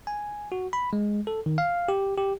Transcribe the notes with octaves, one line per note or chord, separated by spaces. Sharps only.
G#5
F#4
B5
G#3
A4
D#3
F5
G4
G4